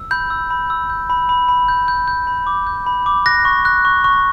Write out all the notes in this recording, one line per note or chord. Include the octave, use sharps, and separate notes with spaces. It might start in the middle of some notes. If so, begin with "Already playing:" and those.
Already playing: E6
B5 G6
E6
B5
E6
G6
B5
B5
B5
G6
G6
G6
B5
D6
G6
B5
D6
F#6 A#6
C#6
F#6
C#6
C#6